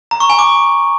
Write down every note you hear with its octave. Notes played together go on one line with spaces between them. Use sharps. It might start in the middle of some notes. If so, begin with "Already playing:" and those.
A#5
C#6
G#5
D6